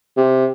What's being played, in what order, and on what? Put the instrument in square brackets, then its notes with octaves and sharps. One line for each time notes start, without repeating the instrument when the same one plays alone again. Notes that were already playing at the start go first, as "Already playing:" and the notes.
[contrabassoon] C3